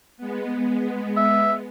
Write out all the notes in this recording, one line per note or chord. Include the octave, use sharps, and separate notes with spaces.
G#3 B3
E5